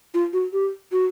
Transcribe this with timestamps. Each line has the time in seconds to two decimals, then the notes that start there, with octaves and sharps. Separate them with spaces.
0.14 F4
0.33 F#4
0.53 G4
0.92 F#4